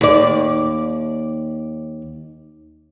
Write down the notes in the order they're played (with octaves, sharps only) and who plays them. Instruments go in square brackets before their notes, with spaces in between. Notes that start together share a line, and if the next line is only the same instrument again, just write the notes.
[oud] D#2 D5